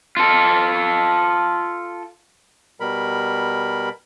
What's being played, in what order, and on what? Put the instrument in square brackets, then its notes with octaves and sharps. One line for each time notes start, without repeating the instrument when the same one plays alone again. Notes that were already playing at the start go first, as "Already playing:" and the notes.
[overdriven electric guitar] F4 A4
[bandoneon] B2 G3 A#4 B5